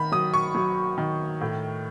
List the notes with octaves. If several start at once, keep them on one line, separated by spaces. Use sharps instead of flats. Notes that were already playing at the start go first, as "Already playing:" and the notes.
Already playing: D#3 B5
F#3 D#6
C#6
F#3
D#3
A2